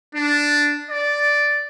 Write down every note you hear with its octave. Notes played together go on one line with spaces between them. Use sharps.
D4
D5